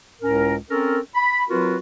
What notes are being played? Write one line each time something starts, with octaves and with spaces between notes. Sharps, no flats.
C#2 A2 C#4 A#4
C4 C#4 A4 A#4
B5
F#3 C4 F4 F#4 A#4 B4